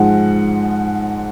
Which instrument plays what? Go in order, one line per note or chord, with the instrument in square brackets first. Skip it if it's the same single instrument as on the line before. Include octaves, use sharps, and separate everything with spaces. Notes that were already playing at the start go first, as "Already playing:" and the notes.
Already playing: [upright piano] G#2 F3 G#3 F#5